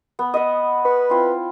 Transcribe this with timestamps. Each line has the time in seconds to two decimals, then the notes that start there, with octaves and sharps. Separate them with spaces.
0.19 B3
0.34 D#5 E5 F#5
0.85 B4 C#6
1.09 C4 E4 F4